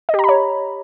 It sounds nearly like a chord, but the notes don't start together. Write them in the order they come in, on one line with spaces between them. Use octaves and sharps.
D#5 G4 A#5 B5 C#5